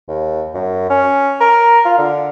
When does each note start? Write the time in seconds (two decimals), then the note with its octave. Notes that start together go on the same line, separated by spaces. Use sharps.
0.08 D#2
0.54 F#2
0.90 C#4
1.40 A#4
1.85 F4
1.98 D3